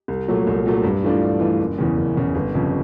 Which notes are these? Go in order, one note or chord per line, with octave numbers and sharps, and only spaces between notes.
C2
A#2 F#3 A3
C2
A#2 F#3 A3
G2
E3 A3 D4 F4
G2
E3 A3 D4 F4
F#1
E2 C#3 E3
F#1
E2 C#3 E3
G1
F2 C#3